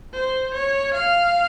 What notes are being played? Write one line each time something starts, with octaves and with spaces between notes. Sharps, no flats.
C5
C#5
F5